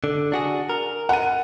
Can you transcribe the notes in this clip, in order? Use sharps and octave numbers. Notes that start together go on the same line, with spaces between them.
D3
D4 F#4 G#4
A#4
F#5 D#7